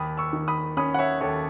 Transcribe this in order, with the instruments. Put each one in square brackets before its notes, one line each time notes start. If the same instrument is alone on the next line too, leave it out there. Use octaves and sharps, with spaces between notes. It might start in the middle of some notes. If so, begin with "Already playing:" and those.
Already playing: [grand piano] D#2 B5 D#6
C#6 E6
D#3
B5 D#6
C#4 B5 D#6
F#5
C#5 E5
D#2 A4 C#5